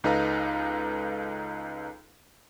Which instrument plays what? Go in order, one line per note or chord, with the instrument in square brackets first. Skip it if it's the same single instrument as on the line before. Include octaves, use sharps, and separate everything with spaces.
[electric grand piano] C#2 D#4 A4 B4 F5 A#5